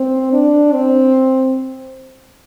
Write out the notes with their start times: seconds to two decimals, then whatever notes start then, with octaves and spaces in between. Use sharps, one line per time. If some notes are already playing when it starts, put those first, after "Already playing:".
Already playing: C4
0.33 D4
0.73 C4